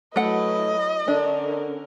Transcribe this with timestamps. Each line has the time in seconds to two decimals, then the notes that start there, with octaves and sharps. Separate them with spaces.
0.16 F#3 A3 E4 B4 D#5 F#5
1.08 D3 C#4 D4 A#4